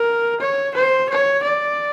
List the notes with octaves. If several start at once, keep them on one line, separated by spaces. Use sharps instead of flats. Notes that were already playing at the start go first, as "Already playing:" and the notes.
Already playing: A#4
C#5
C5
C#5
D5